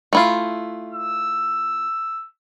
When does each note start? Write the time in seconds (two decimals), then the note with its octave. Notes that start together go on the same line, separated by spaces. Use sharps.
0.13 A3 E4 F4
0.92 E6